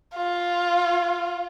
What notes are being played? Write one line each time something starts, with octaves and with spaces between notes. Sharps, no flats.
F4